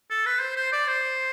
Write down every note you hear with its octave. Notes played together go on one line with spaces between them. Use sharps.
A4
B4
C5
C5
D5
C5